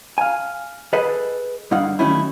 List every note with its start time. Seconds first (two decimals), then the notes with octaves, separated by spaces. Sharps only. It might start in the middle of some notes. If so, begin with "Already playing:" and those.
0.18 F5 G#5
0.93 G#4 A4 B4 D#5
1.71 G2 D3 D#4 F5 F#5
1.99 D#3 F#3 A3 C#4 D#4 E4